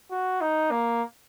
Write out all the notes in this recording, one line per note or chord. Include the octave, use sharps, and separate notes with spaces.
F#4
D#4
A#3